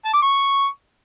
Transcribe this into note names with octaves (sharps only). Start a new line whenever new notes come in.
A5
D6
C#6